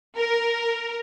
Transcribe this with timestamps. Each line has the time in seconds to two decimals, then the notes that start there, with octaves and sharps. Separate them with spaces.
0.17 A#4